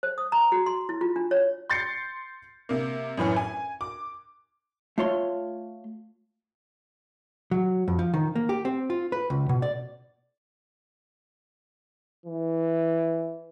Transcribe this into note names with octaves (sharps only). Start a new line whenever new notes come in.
C5
D#6
A#5
F#4
C6
E4
F4
D4
C#5
C6 G6 A6 C7 C#7
C3 A#3
F#2 A2 E3 C#4
G#5
D6
A3 F4 C#5 C6
F#3
F2
F3
D#3
A#3
G4
C4
F4
B4
C#2
B2
D5
E3